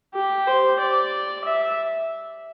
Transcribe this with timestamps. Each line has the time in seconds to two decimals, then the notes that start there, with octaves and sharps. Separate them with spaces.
0.15 G4
0.48 C5
0.80 D5
1.45 E5